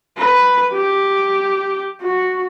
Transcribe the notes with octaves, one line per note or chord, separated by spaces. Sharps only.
B4
G4
F#4